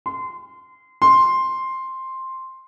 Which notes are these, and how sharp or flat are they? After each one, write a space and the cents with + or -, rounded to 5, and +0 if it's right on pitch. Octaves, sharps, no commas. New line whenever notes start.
C6 -25
C6 +5